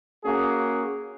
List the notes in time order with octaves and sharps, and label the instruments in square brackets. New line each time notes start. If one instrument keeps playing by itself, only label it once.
[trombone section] A#3 C#4 F#4 G#4